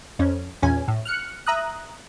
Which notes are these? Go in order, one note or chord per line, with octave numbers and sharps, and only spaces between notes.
F2 C#4
A#1 E2 C#4 G#5
A2
F6 F#6 C#7
E5 A#5 D#6 F#6